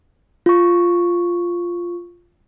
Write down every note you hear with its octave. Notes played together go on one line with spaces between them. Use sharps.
F4 C#6